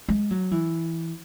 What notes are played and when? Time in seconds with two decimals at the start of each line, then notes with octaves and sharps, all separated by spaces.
0.09 G#3
0.31 F#3
0.51 E3